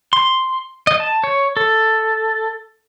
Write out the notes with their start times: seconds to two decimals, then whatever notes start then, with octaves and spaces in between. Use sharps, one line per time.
0.13 C6
0.87 D#5
1.00 A5
1.24 C#5
1.57 A4